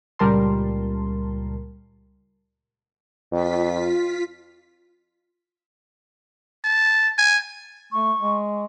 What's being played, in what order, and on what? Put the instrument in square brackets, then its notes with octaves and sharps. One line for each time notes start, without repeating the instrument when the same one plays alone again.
[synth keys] C#2 A#2 G3 A#4 A5 C6
[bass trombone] F2 [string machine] F4 B6
[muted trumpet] A5
G#5
[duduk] A3 [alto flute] C#6
[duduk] G#3